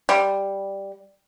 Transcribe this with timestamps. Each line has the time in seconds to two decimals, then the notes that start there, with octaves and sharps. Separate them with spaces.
0.09 G3